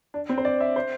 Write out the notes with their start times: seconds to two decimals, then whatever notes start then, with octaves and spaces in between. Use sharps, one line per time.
0.14 D4
0.29 C4
0.38 C5
0.45 D5
0.60 E5
0.76 C5